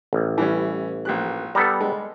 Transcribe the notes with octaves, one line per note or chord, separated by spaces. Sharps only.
A1
E3 G3 C#4
A#1 G4 F#6
G3 B3 A4 A#5
G#3